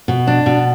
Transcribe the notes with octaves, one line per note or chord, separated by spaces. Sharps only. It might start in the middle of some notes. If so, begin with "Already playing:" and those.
B2
D4
B2